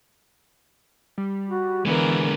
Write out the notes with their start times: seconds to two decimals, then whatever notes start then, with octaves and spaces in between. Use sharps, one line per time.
1.18 G3
1.49 F#4
1.86 D3 E3 G#3 B3 A#4